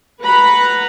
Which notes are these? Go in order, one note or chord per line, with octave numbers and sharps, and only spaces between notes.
B4 F#5 A#5 B5